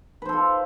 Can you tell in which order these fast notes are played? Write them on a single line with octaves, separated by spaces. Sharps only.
B4 C5 A4 F4